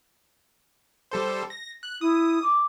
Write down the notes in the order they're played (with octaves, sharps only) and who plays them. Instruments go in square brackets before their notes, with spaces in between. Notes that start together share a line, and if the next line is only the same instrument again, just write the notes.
[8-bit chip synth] G3 A4 C5
A#6
F#6
[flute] E4 [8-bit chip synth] D#6
[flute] D6